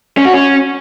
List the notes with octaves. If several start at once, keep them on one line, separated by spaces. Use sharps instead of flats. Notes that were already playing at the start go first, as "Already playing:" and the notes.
C#4
F#4
C#4